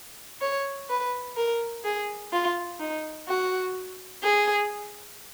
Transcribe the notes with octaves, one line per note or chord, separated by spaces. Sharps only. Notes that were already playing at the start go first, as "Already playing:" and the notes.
C#5
B4
A#4
G#4
F4
D#4
F#4
G#4